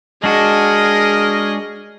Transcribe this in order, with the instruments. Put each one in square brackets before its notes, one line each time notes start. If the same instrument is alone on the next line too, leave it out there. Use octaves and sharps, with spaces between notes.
[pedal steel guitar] G#3 D4 F#4 [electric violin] G#4 D#5 [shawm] A#4